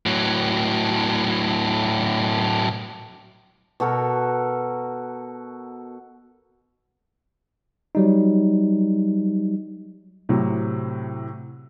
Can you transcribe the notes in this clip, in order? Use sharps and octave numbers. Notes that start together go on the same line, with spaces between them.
A2 F#3
B2 F#4 A4 A#4
F#3 G3 D#4
A2 C3 F#3